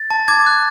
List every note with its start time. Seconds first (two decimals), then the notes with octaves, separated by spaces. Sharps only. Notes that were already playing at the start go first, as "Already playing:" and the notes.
Already playing: A6
0.11 A5
0.28 D6 G#6
0.46 F#6